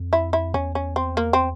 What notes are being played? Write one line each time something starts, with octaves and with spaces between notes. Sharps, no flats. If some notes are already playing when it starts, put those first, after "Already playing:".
Already playing: F2
E4
E4
E2 C#4
C#4
C4
A#3
C4